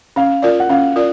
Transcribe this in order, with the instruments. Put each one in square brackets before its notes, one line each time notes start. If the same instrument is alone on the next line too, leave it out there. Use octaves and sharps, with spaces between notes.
[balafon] C#4 [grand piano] F5
[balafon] F4 A#4 D5
[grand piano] F#5
[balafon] C#4 [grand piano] F5
[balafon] F4 A#4 D5